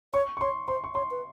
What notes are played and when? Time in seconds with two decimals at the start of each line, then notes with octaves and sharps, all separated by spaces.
0.14 C#5 C#6
0.37 C#6
0.41 C#5 C6
0.68 C5 C6
0.84 C#6
0.94 C#5 C6
1.11 B4